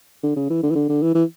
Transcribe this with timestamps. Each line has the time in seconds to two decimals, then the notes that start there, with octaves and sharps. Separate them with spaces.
0.23 D3
0.36 C#3
0.50 E3
0.63 D3
0.71 E3
0.75 D3
0.89 D3
1.02 E3
1.15 E3